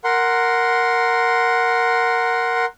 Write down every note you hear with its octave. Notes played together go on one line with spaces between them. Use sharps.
A#4 F#5 C6